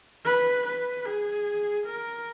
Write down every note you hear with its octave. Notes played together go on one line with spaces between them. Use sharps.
B4
B4
G#4
A#4